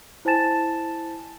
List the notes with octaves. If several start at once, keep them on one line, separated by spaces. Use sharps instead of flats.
E4 C5 G#5 A5 A6 E7